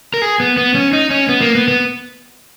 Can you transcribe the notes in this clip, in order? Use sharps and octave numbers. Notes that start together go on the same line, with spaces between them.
A#4
G#4
B3
B3
C#4
D#4
C#4
B3
A#3
B3
B3